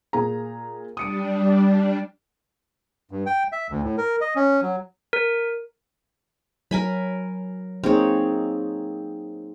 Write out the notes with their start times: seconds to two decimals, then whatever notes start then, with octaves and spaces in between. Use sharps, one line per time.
0.13 A#2 G#4 A#5
0.97 G3 D4 D#6 C#7 D7
3.11 G2
3.26 G5
3.52 E5
3.70 D2
3.83 A2
3.98 A#4
4.21 D#5
4.36 C#4
4.62 F#3
5.13 A#4
6.71 F#3 A#4 G#5 B5
7.83 A#3 C4 D#4 G#4 C#5